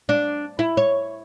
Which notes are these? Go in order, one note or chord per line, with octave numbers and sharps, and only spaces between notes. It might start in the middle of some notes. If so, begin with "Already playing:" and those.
D4
E4
C#5